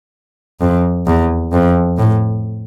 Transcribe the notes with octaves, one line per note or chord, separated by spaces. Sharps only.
F2
E2
F2
A2